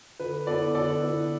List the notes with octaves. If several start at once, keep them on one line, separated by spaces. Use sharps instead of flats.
D3 B4
B3 E4 A4 D5
D3 A4 D5
B3 E4